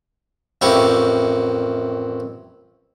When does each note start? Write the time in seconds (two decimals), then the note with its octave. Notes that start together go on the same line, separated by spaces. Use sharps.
0.61 A1 F2 A#3 E4 G4 C#6